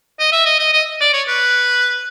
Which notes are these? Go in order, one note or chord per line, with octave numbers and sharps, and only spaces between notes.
D#5
E5
D#5
D#5
D#5
D5
C#5
B4